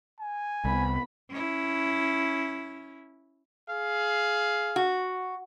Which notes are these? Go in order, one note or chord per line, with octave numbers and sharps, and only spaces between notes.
G#5
C2 B3 B5
C#4 E4
G#4 F5
F#4